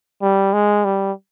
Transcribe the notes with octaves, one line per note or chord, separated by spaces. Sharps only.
G3
G#3
G3